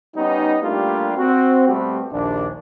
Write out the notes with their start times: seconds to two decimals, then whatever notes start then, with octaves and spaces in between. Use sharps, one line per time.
0.16 G3 B3 C#4 D#4
0.62 G3 A3 A#3 D4 F4 G4
1.17 C4 F#4
1.68 B2 G3 A3 B3 C4 G4
2.12 A#1 D#2 D4